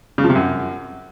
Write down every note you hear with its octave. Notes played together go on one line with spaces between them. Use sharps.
C#3
F3
C3
F#2